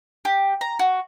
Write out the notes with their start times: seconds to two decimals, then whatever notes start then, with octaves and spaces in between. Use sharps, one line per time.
0.25 G4
0.61 A#5
0.79 F#4